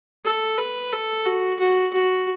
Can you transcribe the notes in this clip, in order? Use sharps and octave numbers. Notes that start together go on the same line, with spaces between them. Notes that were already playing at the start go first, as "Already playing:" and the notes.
A4
B4
A4
F#4
F#4
F#4